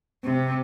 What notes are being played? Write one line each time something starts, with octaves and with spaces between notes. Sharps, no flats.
C3